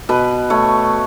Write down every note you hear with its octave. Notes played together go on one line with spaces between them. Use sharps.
B2 B4
A3 C#5